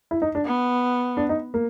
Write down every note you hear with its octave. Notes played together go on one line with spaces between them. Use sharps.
E4
D#4
D4
B3
D4
D#4
A#3